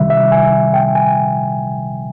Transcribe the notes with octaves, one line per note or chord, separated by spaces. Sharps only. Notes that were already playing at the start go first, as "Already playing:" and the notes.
Already playing: C2 C3 D#3 G3 E5
E5
G#5
G5
G#5